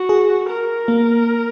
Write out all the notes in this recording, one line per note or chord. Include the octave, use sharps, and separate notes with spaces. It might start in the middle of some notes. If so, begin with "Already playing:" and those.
Already playing: F#4
G#4
A#4
A#3